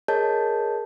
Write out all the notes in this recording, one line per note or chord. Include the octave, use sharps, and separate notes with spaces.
G#4 A#4 C#5 D#5 A5 G6